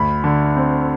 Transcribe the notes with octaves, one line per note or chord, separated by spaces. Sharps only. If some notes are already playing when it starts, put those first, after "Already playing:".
Already playing: D2 B5
D3
C4